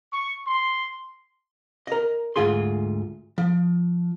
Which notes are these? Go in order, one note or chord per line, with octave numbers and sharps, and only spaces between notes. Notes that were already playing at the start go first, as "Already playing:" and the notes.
C#6
C6
A#4 D#5
D2 G#2 F4 G#4 C6
F3